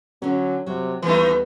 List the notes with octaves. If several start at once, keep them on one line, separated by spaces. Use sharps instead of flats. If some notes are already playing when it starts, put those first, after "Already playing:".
D3 F#3 C#4
C3 F#3 F#4
D#2 E3 G3 A3 B3 D#4 B4